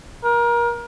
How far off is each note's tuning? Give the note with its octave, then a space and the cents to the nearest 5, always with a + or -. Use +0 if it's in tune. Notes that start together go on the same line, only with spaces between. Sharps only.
A#4 +30